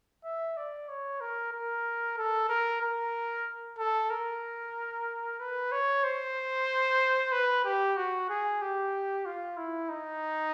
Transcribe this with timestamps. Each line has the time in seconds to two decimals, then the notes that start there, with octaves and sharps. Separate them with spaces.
0.25 E5
0.57 D5
0.89 C#5
1.21 A#4
1.53 A#4
2.18 A4
2.49 A#4
2.82 A#4
3.79 A4
4.10 A#4
5.39 B4
5.72 C#5
6.04 C5
7.32 B4
7.65 G4
7.97 F#4
8.30 G#4
8.62 G4
9.25 F4
9.57 E4
9.89 D#4